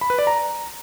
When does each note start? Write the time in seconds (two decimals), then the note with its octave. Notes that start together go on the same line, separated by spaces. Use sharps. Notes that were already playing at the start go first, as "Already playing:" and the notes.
0.01 B5
0.10 B4
0.19 D5
0.27 A#5